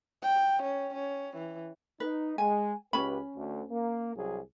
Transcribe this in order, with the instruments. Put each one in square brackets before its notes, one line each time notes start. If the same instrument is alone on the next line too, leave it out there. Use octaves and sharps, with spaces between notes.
[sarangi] G5
C#4
C#4
E3
[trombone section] D#4 [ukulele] B4
[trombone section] G#3 [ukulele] G#5
[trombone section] C#2 G4 B4 [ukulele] C#4 B5
[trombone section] D2
A#3
C2 F#3 G#4